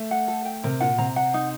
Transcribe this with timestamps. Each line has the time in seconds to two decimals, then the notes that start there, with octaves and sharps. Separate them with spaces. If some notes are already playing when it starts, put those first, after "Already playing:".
Already playing: A3
0.11 F#5
0.28 A4
0.45 G5
0.63 C3 A#4
0.80 A#2 F#5
0.98 C3 A#5
1.16 F#5
1.34 D#4